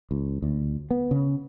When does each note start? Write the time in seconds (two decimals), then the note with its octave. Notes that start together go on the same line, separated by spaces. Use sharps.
0.11 C#2
0.42 D2
0.91 B3
1.11 C#3